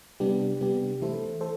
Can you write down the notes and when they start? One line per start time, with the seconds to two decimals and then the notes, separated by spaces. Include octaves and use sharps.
0.20 C3 G3 B3 D4 G4
0.60 C3 G3 B3 D4 G4
1.01 E3 A3 E4 A4 C5
1.41 A4 C5